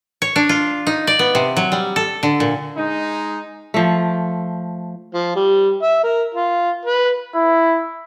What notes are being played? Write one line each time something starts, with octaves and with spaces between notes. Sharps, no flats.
C#5
D4
F4
D#4
D5
B3
C3
F#3
G3
A4
D3
A#2
G#3 D#4
F3 A3
F3
G3
E5
A#4
F4
B4
E4